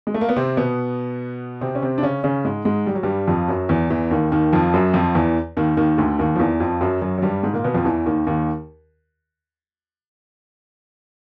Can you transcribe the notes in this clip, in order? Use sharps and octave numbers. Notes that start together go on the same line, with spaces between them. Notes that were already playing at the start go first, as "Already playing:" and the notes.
G#3
A3
A#3
B3
C3 C4
B2 B3
C3 C4
C#4
C3 C4
D4
C#3 C#4
C#3 C#4
G#2 G#3
G#2 G#3
G3
F#3
G2 G3
F2 F3
F#2 F#3
E2 E3
E2 E3
D#2 D#3
D#2 D#3
F2 F3
F#2 F#3
F2 F3
E2 E3
D#2 D#3
D#2 D#3
D2 D3
D#2 D#3
F3
E2 E3
F2 F3
F#2 F#3
F#2 F#3
F#3
G2 G3
G#2 G#3
A#2 A#3
B2 B3
F2 F3
E2 E3
D#2 D#3
D#2 D#3